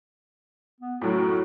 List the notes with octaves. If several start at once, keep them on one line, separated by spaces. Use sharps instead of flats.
B3
F#2 A2 F#4